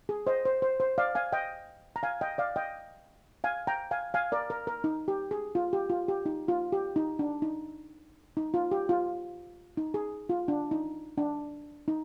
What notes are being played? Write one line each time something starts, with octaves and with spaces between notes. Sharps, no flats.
G#4
C5 D#5
C5
C5
C5
D5 F5
F5 G#5
D#5 G5
A#5
F5 G#5
D#5 G5
D5 F5
D#5 G5
F5 G#5
G5 A#5
F5 G#5
F5 G#5
A#4 D5
A#4
A#4
D#4
G4
G#4
F4
G4
F4
G4
D#4
F4
G4
D#4
D4
D#4
D#4
F4
G4
F4
D#4
G#4
F4
D4
D#4
D4
D#4